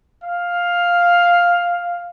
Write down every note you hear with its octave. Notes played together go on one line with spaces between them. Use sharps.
F5